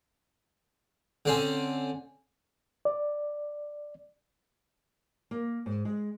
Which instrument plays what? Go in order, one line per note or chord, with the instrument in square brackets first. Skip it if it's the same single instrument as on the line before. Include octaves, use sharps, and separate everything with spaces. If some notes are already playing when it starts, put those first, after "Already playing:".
[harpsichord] D3 C4 C#4
[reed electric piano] D5
[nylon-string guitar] A#3
G#2
G#3